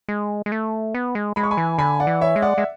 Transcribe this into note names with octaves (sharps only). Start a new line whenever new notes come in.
G#3
G#3
A3
B3
G#3
G#3 B5
C#6
G#5 B5
E3
D3 G#5 B5
D5 F#5
E3
C#5 E5
G#3
D5 F#5
G#3 E5